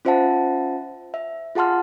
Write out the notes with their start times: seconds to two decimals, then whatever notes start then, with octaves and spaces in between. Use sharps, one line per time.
0.05 C#4 F4 C5 E5 F#5 A5
1.14 E5
1.55 F4 G#4 F#5 A5 C6 F6